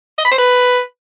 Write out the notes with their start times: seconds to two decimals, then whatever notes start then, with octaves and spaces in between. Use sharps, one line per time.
0.18 D#5
0.25 B5
0.31 C5
0.38 B4